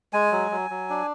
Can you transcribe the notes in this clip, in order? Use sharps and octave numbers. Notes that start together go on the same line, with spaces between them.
G#3 G#5
F#3
F#3
F#3
D4